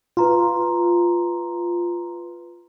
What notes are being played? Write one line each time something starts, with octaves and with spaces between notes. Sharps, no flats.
F4 B4 A#5 C6